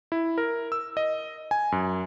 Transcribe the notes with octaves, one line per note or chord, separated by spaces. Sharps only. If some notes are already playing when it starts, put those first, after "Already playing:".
E4
A#4
E6
D#5
G#5
F#2